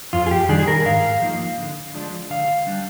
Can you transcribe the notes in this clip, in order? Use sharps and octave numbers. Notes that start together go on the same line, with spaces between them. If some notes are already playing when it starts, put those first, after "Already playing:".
F2 F4
G#4
G4
D#3 G3 D4 G#4
G#4
A#4
G#2 F5
F3 A#3 D#4
D3
F3 G#3 D4
D3 F5
G3 D4